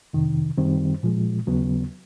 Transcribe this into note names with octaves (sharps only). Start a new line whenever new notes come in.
F2 C3 D#3
F#2 D#3 G3 C4
A#2 F3 G#3
D#2 C#3 F#3 B3